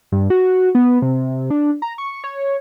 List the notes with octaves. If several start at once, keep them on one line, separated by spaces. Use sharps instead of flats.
G2
F#4
B3
C3
D4
A#5
C#6
C#5